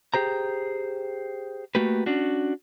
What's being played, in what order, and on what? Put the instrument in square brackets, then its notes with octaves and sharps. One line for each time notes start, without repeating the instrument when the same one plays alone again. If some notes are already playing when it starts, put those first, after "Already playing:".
[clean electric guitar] G4 G#4 C5 A#5
A3 A#3 F#4 G4 B4
C#4 D4 F#4